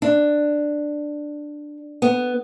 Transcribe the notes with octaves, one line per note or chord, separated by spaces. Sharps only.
D4
B3